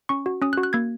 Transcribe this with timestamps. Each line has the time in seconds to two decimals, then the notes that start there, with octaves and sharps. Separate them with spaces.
0.09 C#4 C#6
0.26 F#4
0.42 C#4 D#6
0.53 F#6
0.58 F#4
0.63 F#6
0.73 A#3 G#6